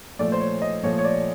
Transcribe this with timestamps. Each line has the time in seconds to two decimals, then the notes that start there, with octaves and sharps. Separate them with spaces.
0.19 A#2 F3 A3 D5
0.32 C5
0.41 C#5
0.62 D#5
0.83 A#2 F3 A3 C#5
0.98 C#5
1.04 D5